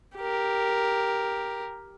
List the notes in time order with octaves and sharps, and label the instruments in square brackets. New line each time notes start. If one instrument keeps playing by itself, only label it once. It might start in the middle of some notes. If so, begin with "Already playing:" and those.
[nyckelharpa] G4 A#4